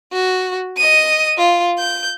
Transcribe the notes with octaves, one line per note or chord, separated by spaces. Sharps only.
F#4
D#5 D#7
F4
G6